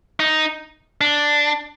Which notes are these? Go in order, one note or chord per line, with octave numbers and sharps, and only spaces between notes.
D#4
D4